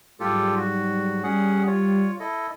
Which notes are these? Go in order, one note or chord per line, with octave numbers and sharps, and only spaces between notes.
G#2 F#3 G3 F4 G4 A4
F#4
G3 C#4 G#4 F#5
F4 C#5
E4 A4 D#5